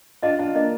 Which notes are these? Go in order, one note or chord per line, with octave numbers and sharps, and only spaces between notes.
D4 F4 D#5
D4 F4
A#3 D4 D#5